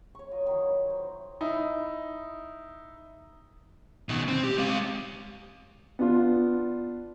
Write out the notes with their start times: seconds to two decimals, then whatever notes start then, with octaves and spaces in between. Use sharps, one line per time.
0.15 C#5 C#6
0.31 F#3 F4 D#5
0.46 D#3 F#3 E4
0.90 C5 E5
1.41 D#4 E4
4.09 B2 D#3
4.28 C4
4.44 G4
4.58 G#3 F5
5.99 B3 D4 F4